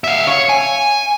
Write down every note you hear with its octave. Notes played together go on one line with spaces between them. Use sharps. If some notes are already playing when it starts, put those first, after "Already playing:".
E5 F5
C#5
G#5